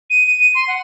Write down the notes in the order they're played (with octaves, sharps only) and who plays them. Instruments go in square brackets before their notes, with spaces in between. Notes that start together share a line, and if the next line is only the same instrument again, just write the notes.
[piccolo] D#7
D#7
D#7
C6
F#5